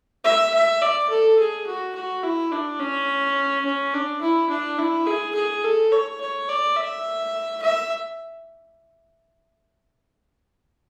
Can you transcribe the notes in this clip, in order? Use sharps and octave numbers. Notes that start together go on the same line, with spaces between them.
E5
E5
D5
A4
G#4
F#4
F#4
E4
D4
C#4
C#4
D4
E4
D4
E4
G#4
G#4
A4
C#5
C#5
D5
E5
E5